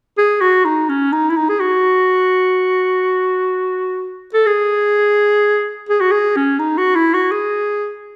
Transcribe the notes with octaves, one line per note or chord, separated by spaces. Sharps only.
G#4
F#4
D#4
C#4
D#4
E4
D#4
G#4
F#4
A4
G#4
G#4
F#4
G#4
C#4
D#4
F#4
E4
F#4
G#4